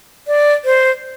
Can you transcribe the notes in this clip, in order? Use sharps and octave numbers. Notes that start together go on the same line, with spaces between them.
D5
C5